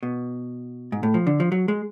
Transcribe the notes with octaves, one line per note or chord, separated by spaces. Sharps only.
B2
G#2
A2
F3
D3
F3
F#3
G#3